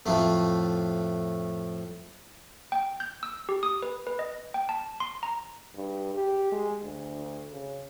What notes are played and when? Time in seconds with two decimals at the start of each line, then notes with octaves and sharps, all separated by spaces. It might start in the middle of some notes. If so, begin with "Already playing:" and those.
0.06 F2 A2 A3
2.72 G5
3.00 G6
3.23 E6
3.49 G4
3.63 D#6
3.82 B4
4.07 B4
4.19 D#5
4.54 G5
4.69 A5
5.00 C6
5.23 A#5
5.74 G2
6.14 G4
6.52 G#3
6.82 D2
7.51 C#3